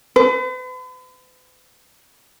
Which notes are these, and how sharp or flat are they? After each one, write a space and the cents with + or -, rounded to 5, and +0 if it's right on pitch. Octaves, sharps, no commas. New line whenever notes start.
B4 +45